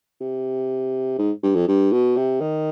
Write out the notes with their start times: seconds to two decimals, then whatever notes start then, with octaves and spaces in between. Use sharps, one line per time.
0.21 C3
1.19 G#2
1.43 G2
1.56 F2
1.68 G2
1.93 B2
2.17 C3
2.41 D#3